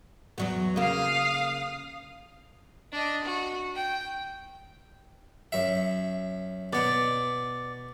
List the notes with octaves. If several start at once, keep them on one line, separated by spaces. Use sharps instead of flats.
E2 F#3 B3
C#3 A#3 F5 D#6
D4 D#5
F#4
G5
F#2 E5
B2 B3 D5